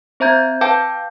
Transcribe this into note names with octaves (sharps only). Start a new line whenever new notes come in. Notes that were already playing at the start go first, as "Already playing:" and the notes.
C4 C5 E5 A#5 G6 G#6
B4 F5 G5 A5 D6 G6